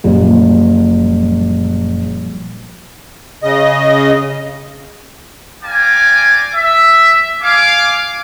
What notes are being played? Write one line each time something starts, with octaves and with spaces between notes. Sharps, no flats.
F#1 A#2 F3 G3
C#3 D#5
D5 F5 G5 G#5 A#5 D6
E5
F5 G#5 D6